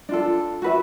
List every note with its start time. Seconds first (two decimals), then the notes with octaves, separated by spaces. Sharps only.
0.09 D4 F4 A4
0.62 F#4 B4 E5